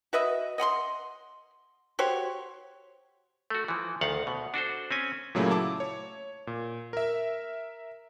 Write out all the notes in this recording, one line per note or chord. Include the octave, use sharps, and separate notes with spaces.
F#4 B4 D#5 E5
D#5 F#5 B5 C6
F#4 G4 C5 C#5
A3 F#4
E3 F3
D2 D#3 F5 F#5
B2
D4 F#4 A4 C5
C4 C#4 G#5
A#2 C#3 F#3 A3 A#3 E4
E4 A5 D6
C#5
A#2
A#4 E5